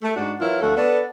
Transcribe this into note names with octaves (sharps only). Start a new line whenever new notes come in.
A3
G#2 D4 F#4
E3 F#3 C#4 E4 F4 A#4
D2 F3 A3 F#4 A4 E5
B3 D4 A4